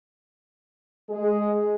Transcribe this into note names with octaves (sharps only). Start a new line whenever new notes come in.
G#3 G#4